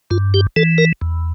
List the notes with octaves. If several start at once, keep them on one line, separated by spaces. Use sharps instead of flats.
G2 F4
G4
E3 A4
A#4
E2